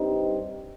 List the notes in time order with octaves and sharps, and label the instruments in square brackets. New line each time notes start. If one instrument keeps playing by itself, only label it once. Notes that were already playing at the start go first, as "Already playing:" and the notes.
Already playing: [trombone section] G2 G3 C4 D#4